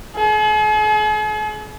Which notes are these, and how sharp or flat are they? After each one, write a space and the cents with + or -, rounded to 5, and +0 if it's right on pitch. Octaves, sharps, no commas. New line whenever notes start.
G#4 +45